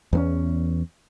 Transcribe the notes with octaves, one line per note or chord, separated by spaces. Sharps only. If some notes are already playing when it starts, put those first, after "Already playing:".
E2 A#3 C#4